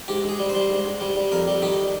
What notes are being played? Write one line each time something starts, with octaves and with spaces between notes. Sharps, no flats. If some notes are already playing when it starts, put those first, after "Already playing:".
G#2 G4
G#2
G#4
G3
C5
G3
G#2
G#2
G3
G3
F2 A#4
G3
D#3 G4